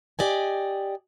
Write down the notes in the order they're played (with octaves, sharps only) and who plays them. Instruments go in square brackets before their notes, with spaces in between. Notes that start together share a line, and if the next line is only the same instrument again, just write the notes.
[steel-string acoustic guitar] G4 D5 D#5 G#5